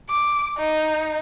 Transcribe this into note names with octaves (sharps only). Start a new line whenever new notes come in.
D6
D#4